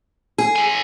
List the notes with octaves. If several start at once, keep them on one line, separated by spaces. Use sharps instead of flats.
G#4
A2 G#5